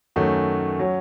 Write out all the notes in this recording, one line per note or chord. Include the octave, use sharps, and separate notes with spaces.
F#2 D#3 A3 C#4 F#4
F#3 C#4 F#4